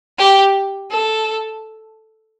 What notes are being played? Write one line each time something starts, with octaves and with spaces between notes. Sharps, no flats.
G4
A4